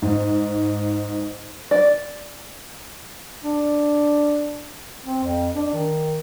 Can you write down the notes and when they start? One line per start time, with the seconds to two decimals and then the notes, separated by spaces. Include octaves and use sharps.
0.02 G#2
1.71 D5
3.44 D4
5.05 C4
5.24 F2
5.55 D4
5.73 D#3